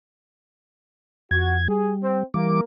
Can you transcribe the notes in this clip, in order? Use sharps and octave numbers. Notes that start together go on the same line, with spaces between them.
F2 F#4 G#6
G3 G#4
C4
E3 G3 A#3 D6